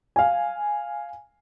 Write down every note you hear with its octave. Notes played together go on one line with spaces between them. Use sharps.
F5 G#5